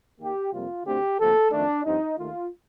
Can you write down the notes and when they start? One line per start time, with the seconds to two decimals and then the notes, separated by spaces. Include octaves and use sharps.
0.20 D#2 D#3 A#3 G4
0.53 F2 C3 G3 A#3 F4
0.85 D2 D3 A3 C4 G4
1.19 D2 C3 F3 A#3 A4
1.52 F2 D#3 A3 D4
1.84 G2 F3 C4 D#4
2.17 D#2 D#3 A3 F4